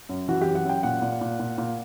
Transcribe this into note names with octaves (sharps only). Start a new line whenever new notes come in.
F#2
E3 F#4
F#2 G4
F#5
F#2 G5
A#2 F#5
A#2
A#2
A#2
A#2